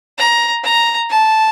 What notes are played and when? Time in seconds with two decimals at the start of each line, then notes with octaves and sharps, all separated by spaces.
0.18 A#5
0.64 A#5
1.10 A5